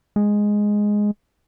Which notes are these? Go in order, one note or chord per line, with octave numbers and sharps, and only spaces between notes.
G#3